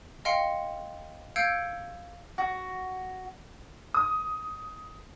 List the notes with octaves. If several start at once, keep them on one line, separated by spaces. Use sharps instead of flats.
D#5 F5 G5 C6 C#7
F5 E6 G6 G#6 C#7 D7
F#4
D#6